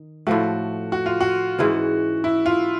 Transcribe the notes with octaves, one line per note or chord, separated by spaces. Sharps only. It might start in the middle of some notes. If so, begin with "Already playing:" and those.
Already playing: D#3
A2 F3 A3 F#4
F#4
F4
F#4
G#2 E3 G#3 C#4
E4
F4